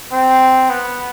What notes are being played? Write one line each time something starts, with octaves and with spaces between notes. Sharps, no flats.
C4
B3